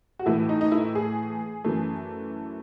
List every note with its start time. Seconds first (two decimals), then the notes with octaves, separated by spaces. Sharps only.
0.19 F#4
0.26 A2 E3 A3 E4
0.49 D#4
0.61 D#4
0.72 E4
0.95 G#4
1.64 F#2 E3 A3